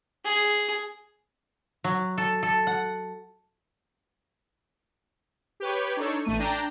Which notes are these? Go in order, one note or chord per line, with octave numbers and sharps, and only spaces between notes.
G#4
F#3
A4
A4
F#5
G4 B4 C#5
D4 D#4 A4 C#5
A1 A3 D#7
D4 G5 A#5